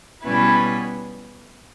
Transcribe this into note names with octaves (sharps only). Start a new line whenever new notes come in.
B2 G3 C#4 E4 B4